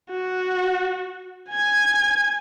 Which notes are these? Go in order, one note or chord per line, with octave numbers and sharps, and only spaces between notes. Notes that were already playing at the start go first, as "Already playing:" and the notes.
F#4
G#5 G#6